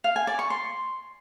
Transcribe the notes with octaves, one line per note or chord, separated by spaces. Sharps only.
F5
G#5
D5
C#6
C6